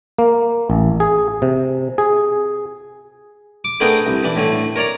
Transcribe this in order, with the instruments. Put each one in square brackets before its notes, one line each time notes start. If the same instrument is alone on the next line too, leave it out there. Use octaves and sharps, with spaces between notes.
[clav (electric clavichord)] A#3
A1
G#4
C3
G#4
[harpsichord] D6
A3 B3 D4 G#4 A#4 G5
C2
E3 D4
A2 D3 A3
A#4 C#5 D5 A#5